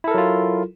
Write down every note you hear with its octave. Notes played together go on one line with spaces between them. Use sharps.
F#3 E4 F4 A4 A#4